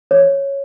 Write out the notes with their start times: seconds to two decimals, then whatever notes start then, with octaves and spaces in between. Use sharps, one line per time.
0.11 C#5